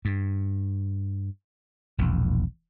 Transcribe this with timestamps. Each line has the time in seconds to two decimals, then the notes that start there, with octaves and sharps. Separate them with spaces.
0.05 G2
1.98 E1 A#1 E2